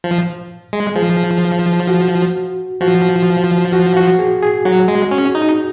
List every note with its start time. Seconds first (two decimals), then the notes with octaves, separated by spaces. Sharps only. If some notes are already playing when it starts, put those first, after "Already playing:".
0.04 F3
0.73 G#3
0.96 F3 G#4
1.89 F#4
2.81 F3 F#4
3.73 F#4
3.97 F#4
4.19 G#4
4.43 G#4
4.65 F#3 F#4
4.88 G#3
5.11 C#4
5.35 D#4